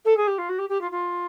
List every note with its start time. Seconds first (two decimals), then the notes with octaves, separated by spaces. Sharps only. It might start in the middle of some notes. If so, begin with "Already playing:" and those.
0.05 A4
0.17 G#4
0.27 G4
0.38 F4
0.49 F#4
0.58 G4
0.69 G4
0.81 F4
0.91 F4